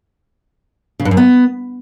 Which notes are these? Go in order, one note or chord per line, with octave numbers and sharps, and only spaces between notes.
C#3
G2
F#2
B3